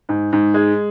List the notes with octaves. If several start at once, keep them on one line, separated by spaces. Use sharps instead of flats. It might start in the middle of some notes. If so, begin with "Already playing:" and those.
G#2
G#2
G#3